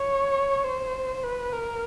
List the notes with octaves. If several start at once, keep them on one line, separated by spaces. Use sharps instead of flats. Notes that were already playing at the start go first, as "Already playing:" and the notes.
Already playing: C#5
C5
B4
A#4